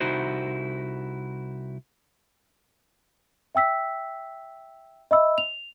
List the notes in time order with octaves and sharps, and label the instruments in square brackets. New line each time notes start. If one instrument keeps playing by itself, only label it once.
[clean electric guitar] C2 D#4 E4 F#4 C5
[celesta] E5 G5 E6 B6
D#5 E5 B5 E6
F7